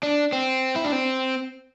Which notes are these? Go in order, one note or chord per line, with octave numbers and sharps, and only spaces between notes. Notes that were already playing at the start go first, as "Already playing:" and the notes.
D4
C4
E4
D4
C4